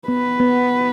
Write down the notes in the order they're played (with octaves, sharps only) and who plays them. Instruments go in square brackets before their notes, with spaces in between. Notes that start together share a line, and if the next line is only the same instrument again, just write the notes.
[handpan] B3 [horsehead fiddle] B4
[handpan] B3